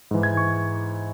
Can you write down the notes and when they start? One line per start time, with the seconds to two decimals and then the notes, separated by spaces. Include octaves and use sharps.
0.11 G#2 E3
0.23 G#6
0.37 C#6